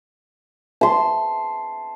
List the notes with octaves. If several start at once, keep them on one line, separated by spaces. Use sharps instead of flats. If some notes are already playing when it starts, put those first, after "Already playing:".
A5 C6